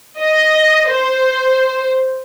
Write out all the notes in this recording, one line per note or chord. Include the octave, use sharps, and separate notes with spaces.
D#5
C5